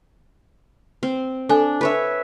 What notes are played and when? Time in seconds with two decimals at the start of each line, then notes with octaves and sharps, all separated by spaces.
1.03 C4
1.49 D4 A4 G#5
1.81 B4 C#5 E5